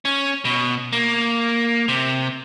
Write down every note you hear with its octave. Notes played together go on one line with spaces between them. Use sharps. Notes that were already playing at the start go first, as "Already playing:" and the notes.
C#4
B2
A#3
C3